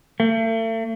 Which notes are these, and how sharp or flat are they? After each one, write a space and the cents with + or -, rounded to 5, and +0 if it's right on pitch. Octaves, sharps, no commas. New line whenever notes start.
A3 +40